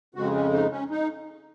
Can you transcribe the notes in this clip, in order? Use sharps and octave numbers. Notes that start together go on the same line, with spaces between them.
F2 C#3 G#3 F#4
C#4
D#4
C#4
D#4